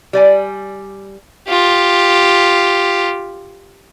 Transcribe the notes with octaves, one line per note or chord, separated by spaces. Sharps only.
G3 D5 G#5
F4 G4